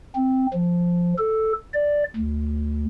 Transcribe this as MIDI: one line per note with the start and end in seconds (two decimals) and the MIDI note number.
0.16 0.47 60
0.54 1.14 53
1.18 1.52 69
1.73 2.04 74
2.16 2.85 38